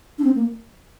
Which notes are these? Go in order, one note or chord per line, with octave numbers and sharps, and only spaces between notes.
D4
C4
A#3